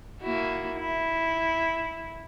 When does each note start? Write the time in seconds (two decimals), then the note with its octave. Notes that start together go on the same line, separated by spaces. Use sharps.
0.22 A#3 E4 F#4
0.79 E4